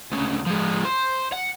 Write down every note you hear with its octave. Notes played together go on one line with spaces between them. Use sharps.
D2 C#3
F3 G#3
C5
F#5